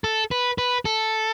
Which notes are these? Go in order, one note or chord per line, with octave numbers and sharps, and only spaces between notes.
A4
B4
B4
A4